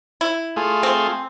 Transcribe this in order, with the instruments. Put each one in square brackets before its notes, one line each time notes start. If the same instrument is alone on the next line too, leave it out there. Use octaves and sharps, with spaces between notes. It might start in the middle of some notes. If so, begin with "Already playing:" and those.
[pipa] E4
[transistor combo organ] A3 F4 G#4
[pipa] C4